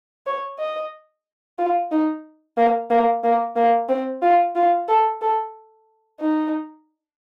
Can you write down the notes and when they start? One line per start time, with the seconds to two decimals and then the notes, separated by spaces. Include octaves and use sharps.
0.26 C#5
0.59 D#5
1.59 F4
1.91 D#4
2.57 A#3
2.90 A#3
3.24 A#3
3.56 A#3
3.89 C4
4.22 F4
4.55 F4
4.88 A4
5.21 A4
6.20 D#4